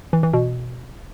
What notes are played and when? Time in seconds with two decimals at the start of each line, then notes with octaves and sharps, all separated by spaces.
0.13 E3
0.23 E3
0.33 B2